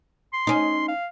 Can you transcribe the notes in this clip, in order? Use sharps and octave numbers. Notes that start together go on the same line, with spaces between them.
C6
C#4 D#4
F5